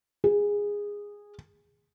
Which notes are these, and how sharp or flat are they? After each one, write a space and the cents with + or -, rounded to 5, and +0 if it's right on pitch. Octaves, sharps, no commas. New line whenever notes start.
G#4 -15